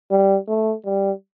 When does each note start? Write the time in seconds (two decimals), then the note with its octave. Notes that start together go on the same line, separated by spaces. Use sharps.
0.11 G3
0.48 A3
0.85 G3